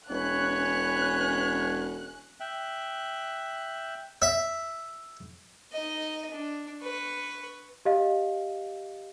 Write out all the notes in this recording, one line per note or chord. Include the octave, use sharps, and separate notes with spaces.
E1 C#4 B4 C#5 F#6
E5 G5 F#6
E5
D#4 D#5
D4
B4 C#6
G4 D#5 F5